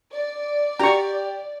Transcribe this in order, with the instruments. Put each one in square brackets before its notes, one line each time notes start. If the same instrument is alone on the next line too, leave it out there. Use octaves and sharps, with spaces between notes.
[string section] D5
[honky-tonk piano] G4 [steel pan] A#5 C#6